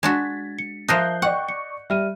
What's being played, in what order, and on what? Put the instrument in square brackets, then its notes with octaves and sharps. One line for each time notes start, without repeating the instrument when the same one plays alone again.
[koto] G#3 D4 F#4 [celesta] G#6 [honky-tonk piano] A6 B6
[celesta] C#7
[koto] F3 A#4 D#5 [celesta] E5 A5 [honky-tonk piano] F#6 G6 C7
[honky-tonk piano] D5 D#5 C#6 [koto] F#5 [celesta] G5
[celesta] C#7
[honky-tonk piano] G3 [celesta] E5 F6 D#7